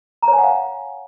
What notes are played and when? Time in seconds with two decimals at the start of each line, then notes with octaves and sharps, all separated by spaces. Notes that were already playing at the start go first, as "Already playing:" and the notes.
0.22 A#5
0.28 C#5
0.33 G#5
0.38 F#5
0.44 F5